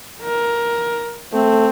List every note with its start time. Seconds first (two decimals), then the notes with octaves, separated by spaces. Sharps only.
0.22 A#4
1.33 A3 C4